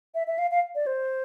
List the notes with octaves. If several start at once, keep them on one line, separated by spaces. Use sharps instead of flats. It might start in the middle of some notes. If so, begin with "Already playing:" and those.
E5
E5
F5
F5
D5
C5